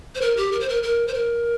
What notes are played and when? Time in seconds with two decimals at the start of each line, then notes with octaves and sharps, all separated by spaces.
0.15 C5
0.21 A#4
0.37 G4
0.52 A#4
0.60 C5
0.69 A#4
0.83 A#4
1.07 C5
1.14 A#4